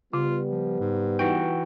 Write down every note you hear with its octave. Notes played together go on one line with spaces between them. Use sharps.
C#3 G3 B3 F4
F3
G#2
E3 D#4 F#4 G5